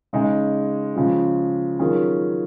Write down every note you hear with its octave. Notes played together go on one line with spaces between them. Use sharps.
C#3 G#3 D#4 G#4
C#3 F3 G#3
D#3 F#3 C#4 F4 G#4